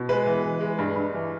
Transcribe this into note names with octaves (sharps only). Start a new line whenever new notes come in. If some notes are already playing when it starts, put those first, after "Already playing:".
Already playing: B2
G#3 B4
E3
E3
G#3
G2
G2
E3